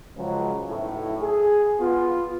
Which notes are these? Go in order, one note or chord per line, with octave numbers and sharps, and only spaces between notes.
C#2 C#3 F3 F#3
B1 A2 E4
G#4
B3 F4